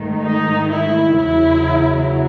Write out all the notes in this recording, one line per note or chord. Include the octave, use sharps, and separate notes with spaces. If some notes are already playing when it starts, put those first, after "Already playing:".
Already playing: G#2 D#3 A3
D#4
E4
E2 C#3 F#3 E4